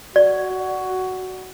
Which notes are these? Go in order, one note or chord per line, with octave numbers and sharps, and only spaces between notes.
F#4 D5